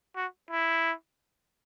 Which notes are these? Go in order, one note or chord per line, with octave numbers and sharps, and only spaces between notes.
F#4
E4